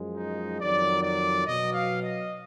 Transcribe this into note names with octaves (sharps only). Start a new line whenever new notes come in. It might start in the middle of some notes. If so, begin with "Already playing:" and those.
Already playing: F#2 F3 G#3
D#4
F2 D#3 F#3 D5
D5
B2 F#3 D#5
F5
D#5